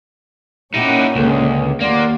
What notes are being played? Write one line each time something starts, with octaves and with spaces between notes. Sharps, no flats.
A#2 A#3 C#4 D#4 E4 G4 F#5
C#2 D3 G#4
D#2 A#3 D5 F#5 C6